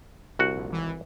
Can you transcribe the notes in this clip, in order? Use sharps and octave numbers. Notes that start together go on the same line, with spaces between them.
C2 F#4 F#5
A#1
G#1 E3